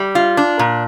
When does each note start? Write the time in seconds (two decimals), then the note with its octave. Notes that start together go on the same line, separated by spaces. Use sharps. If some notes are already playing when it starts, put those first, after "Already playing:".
Already playing: G3
0.15 F4
0.37 D4
0.59 A#2